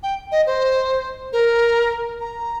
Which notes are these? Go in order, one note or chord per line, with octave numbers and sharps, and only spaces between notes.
G5
D#5
C5
A#4
A#5